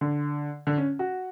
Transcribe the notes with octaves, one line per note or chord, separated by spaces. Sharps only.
D3
D3
C#4
F#4